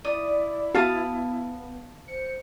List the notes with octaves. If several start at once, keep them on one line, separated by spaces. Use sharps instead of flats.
E4 D5 D#6
B3 F#4 F5 A5 D#6
C5 C#7